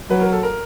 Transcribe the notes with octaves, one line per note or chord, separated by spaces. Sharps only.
F#3 B4
A#4
A4
A#4